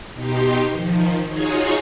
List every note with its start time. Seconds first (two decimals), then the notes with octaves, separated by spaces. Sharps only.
0.14 B2 D#4 G4 C6
0.71 D#3 F3
1.26 D#4 F4 F#4 G#4 C#5